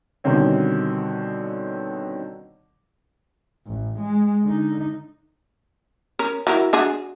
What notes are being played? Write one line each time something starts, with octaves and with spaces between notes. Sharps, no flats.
B2 D3 D#3 G3 C4 C#4
A1
G#3
D3 D#4
C#4 A#4
F#3 E4 A#4
D4 F#4 G#4